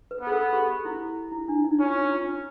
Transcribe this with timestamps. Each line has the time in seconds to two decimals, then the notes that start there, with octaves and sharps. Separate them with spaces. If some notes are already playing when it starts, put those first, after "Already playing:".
0.11 B4
0.21 B3
0.27 G#4
0.32 A4
0.53 G4
0.85 E4
1.32 E4
1.48 D4
1.64 D#4
1.80 C#4 F4
2.11 F4